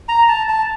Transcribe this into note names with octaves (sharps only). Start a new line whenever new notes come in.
A#5
A5
A5